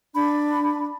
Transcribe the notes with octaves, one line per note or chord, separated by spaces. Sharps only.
D4 B5